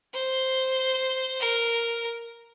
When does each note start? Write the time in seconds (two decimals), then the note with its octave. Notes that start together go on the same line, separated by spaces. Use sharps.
0.14 C5
1.40 A#4